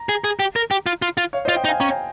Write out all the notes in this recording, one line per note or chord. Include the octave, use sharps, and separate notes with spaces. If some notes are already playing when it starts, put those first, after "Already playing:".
Already playing: A#5
G#4
G#4
G4
A#4
G4
F4
F4
F4
C#5 F5
C5 D#5
F4
D#5 G5
D#4
F5 G#5
C#4 G5 A#5